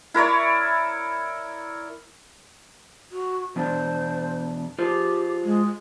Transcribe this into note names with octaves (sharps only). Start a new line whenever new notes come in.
E4 A#4 C#5 D5
F#4
E2 B2 D4 C5
F4 G4 G#4 C5
G#3